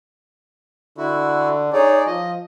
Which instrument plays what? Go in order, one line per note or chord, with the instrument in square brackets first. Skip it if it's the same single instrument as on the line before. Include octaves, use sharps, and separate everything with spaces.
[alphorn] D3 [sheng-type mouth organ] E4 F#4
[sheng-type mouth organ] D#4 G#4 D5 [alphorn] C#5
[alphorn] F3 [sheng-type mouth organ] D#5